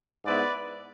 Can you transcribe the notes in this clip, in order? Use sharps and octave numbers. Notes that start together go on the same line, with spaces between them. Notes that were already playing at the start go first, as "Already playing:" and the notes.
G#2 G#3 B3 E4 B4 D5